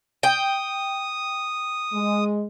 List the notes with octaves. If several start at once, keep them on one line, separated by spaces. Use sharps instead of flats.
G5 D#6
G#3